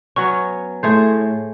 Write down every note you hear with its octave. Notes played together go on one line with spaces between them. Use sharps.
F#3 B3 C#4 C#6
A2 A3 G#4 C5